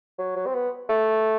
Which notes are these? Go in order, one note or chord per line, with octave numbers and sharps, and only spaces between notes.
F#3
F#3
C4
B3
A3